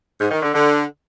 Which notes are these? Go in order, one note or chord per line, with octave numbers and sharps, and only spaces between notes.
G#2
D#3
D3
D3